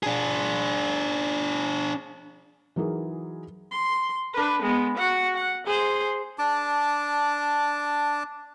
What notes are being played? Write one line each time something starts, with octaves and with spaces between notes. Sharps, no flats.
D4 G#4
E3 F#3 D#4 G#4 A#4
C6
D4 B4
G#3 B3
F#4 F#5
F#5
G#4 C5
D4 A5 D6